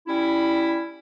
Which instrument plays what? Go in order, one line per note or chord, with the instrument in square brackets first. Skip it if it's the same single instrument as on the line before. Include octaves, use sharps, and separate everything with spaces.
[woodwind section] G3 C#4 E4